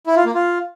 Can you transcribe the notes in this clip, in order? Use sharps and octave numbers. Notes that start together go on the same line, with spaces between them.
E4
F4
A#3
F4